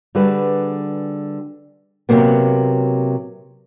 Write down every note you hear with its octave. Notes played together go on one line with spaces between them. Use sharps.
D3 G3 F#4 G#4 B4
C3 F#3 A#3 B3